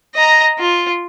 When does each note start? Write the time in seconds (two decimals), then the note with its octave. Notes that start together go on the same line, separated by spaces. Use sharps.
0.15 D#5 A#5
0.58 F4